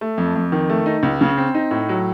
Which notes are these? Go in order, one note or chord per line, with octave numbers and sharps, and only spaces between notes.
A3
F2
F2
D#3
A3
D#4
C#2
C#3
C4
D#4
A2
F#3